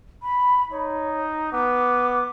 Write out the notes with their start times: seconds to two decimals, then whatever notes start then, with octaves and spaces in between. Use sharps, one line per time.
0.22 B5
0.71 D#4 C#5
1.52 B3 D6